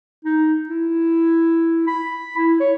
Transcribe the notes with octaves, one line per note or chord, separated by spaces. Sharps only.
D#4
E4
B5
E4
C#5